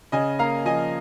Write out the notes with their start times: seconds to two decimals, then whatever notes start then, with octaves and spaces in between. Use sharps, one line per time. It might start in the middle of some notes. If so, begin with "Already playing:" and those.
0.12 C#3 D#5 G#5
0.39 A#3 F5 A#5
0.65 F3 D#5 G#5